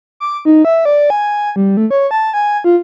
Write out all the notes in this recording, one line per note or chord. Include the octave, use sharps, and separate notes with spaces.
D6
D#4
E5
D5
G#5
G3
A3
C#5
A5
G#5
F4